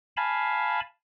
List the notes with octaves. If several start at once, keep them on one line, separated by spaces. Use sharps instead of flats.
F5 G#5 A5 B5